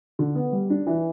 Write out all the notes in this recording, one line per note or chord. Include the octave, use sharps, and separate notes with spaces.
D3
B3
G3
D4
E3